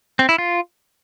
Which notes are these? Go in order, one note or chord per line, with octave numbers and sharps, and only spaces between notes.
C4
E4
F4